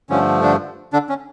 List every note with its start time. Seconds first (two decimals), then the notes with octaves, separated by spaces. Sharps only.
0.10 G2 D3 F3 A3 C#4
0.43 D3 D4
0.93 D3 D4
1.09 C#4